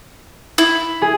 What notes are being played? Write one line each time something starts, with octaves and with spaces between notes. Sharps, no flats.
E4
G#4